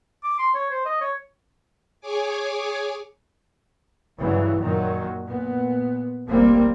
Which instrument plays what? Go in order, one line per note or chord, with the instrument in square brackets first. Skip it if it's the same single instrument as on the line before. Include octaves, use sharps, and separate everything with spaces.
[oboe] D6
C6
C#5
C5
D#5
C#5
[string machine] G#4 C#5 G#5 D6
[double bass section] G2 C#3 E3 F#3
F#2 A#2 D#3 F#3
A#2 B3
F1 A#1 G3 A#3 C4